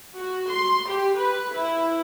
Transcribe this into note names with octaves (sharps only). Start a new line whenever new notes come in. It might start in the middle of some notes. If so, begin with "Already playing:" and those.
F#4
C6
G4
B4
E4